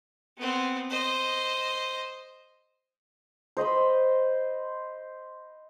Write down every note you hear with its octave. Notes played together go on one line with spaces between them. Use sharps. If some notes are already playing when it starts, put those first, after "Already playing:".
B3 C4
C5 D#5
C5 D#5 B5 C6